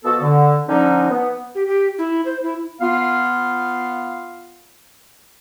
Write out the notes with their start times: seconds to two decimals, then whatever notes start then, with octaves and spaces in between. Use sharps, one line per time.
0.05 B2 F3 B3 F#4 A4
0.22 D3
0.69 D3 F3 C#4 D#4
1.11 B3
1.55 G4
1.67 G4
1.98 E4
2.25 C5
2.43 E4
2.81 B3 F4 F5